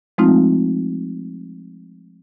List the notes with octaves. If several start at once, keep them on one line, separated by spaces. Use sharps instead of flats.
F3 G#3 A3 C4 D#4 F4